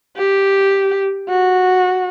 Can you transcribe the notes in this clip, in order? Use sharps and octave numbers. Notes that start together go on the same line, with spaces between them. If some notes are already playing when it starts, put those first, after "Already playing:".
G4
F#4